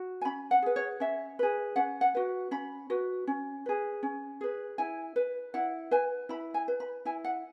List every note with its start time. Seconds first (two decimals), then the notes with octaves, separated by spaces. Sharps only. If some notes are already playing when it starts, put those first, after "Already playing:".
Already playing: F#4
0.21 G#5
0.25 C#4 B5
0.51 F#5
0.62 G#4 B4
0.76 C#5
1.00 C#4 E5
1.39 G#4 B4
1.76 C#4 F#5
2.01 F#5
2.15 F#4 B4
2.51 C#4 B5
2.90 F#4 B4
3.27 C#4
3.66 G#4 B4
4.03 C#4
4.41 G#4 B4
4.78 E4 G#5
5.16 B4
5.54 E4 F#5
5.91 B4 G#5
6.29 E4 B5
6.54 G#5
6.68 B4
6.80 B5
7.05 E4 G#5
7.24 F#5